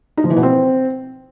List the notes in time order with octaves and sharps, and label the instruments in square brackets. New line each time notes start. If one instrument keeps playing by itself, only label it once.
[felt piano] D#4
F3
E3
B2
C4